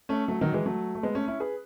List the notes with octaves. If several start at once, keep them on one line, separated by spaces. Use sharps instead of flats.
A3 C#4
F#3 A3
D#3 F#3
E3 G#3
F#3 A3
A3
G#3 B3
A3 C#4
C#4 E4
G#4 B4